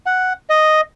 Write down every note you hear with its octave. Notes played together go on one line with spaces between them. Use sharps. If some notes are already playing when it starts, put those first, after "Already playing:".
F#5
D#5